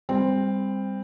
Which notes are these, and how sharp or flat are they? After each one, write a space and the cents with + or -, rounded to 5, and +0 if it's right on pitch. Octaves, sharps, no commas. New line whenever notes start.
G3 +25 C4 +0